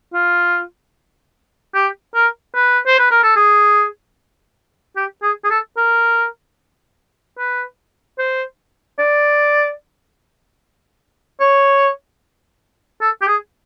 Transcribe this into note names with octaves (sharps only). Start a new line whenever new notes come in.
F4
G4
A#4
B4
C5
B4
A#4
A4
G#4
G4
G#4
G#4
A4
A#4
B4
C5
D5
C#5
A4
G4
G#4